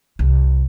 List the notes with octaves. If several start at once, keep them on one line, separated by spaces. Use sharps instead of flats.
C2